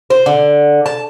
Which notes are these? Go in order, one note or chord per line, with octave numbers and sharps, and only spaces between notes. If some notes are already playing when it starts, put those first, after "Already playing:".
C5
D3
A5